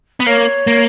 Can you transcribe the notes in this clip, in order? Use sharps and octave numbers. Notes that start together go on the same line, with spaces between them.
B3
A#3 C#5
A#3